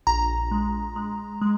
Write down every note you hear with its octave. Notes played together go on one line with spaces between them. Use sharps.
A#1 A#5
G#3
G#3
G#3